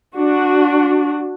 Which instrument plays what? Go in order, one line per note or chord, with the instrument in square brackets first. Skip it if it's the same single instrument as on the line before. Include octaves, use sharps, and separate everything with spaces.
[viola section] D4 F#4